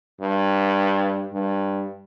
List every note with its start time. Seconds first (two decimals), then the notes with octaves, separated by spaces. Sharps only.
0.20 G2
1.33 G2